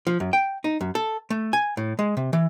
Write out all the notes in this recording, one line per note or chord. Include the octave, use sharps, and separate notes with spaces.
F3
F#2
G5
D#4
F#2
A4
A3
G#5
A2
G#3
C3
E3